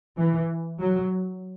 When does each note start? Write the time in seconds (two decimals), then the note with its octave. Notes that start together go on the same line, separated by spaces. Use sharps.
0.18 E3
0.81 F#3